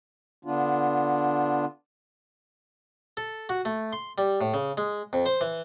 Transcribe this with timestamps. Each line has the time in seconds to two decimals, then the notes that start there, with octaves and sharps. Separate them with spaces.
0.45 D3 B3 D4 F4
3.17 A4
3.49 F#4
3.65 A3
3.93 C6
4.18 G3
4.41 A2
4.54 C#3
4.77 G#3
5.13 F2
5.26 C5
5.41 E3